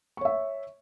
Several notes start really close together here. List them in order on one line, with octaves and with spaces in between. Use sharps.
C#6 C#5 E5